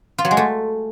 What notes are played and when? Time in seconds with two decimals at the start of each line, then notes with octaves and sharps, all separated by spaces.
0.18 F4
0.25 F#3
0.31 G#3
0.37 A3